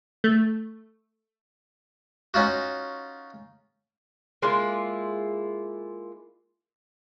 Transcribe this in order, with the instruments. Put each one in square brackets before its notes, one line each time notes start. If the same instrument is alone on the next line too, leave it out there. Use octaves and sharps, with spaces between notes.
[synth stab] A3
[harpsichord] C#4 D#4 F4 F#4
[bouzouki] G#3 A#3 E4 F4